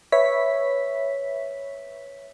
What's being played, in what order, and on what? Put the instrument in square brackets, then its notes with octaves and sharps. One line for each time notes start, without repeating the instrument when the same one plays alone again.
[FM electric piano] B4 C#5 E5 B6